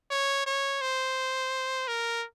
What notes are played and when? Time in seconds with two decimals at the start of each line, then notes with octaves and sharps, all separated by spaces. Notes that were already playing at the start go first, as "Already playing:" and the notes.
0.11 C#5
0.46 C#5
0.81 C5
1.88 A#4